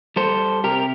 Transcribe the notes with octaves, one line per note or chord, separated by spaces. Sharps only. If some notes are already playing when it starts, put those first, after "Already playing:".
G3 A4 C5
C3 G4 A#4